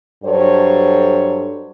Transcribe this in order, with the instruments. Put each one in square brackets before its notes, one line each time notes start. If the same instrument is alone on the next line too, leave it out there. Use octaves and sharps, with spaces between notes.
[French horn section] G2 F#3 A4 C5 C#5